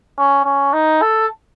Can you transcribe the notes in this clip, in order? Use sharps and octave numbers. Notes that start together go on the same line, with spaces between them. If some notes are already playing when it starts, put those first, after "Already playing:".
C#4
C#4
D#4
A4